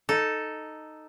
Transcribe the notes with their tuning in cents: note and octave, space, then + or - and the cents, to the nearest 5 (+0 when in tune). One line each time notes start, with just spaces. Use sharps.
D#4 -5 A4 +0